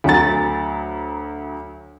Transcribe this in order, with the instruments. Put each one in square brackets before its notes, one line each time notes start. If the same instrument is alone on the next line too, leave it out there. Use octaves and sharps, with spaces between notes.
[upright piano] D2 F#3 F#5 A#5 A6